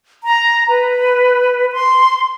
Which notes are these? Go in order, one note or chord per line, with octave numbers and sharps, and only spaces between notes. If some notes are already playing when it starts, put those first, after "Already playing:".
A#5
B4
C6